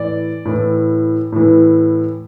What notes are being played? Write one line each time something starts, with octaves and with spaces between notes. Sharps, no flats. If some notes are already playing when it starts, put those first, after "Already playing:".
Already playing: A2 E3 D5
A2 E3
A2 E3